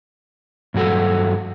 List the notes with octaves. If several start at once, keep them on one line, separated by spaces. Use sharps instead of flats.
G2 F#3 F#4 A4